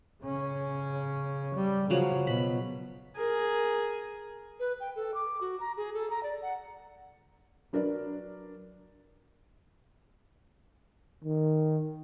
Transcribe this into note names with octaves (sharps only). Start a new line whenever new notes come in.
C#3 C#4
G3
C#3 F3 F#3
B2 B5
G#4 A#4
B4
G5
A4
D6
F#4
A#5
G#4
A4
A#5
D5
F#5
F#3 D4 A#4 B4 D5
D#3